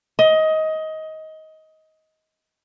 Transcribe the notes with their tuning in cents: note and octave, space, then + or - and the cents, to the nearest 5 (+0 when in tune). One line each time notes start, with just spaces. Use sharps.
D#5 +20